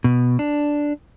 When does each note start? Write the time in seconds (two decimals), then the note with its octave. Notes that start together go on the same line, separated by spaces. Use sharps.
0.04 B2
0.39 D4